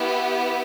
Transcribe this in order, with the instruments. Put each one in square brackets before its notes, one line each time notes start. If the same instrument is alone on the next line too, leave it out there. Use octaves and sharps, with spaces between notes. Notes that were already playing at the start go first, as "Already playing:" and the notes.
Already playing: [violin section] B3 E4 G4